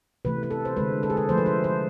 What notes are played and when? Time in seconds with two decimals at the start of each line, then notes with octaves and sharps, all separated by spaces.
0.25 C3 E3 A3 B4
0.43 B4
0.51 A4
0.65 C5
0.76 D3 G#3 B4
1.03 A4
1.10 G#4
1.17 A4
1.29 D3 F3 A3 C5
1.38 B4
1.46 C5
1.64 C5